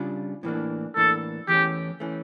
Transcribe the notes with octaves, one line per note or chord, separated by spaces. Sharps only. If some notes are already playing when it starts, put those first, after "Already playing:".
Already playing: C#3 G3 D4 F4
A2 E3 A#3 D4
A2 E3 A#3 D4 A4
E2 E3 A3 C#4 G4
E3 A3 C#4